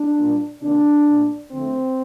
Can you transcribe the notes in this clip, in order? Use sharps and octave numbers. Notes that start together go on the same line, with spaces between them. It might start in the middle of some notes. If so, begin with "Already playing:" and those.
Already playing: D4
A#2 G3 A#3
C3 D#3 A#3 D4
A#2 A3
D3 F3 A3 C4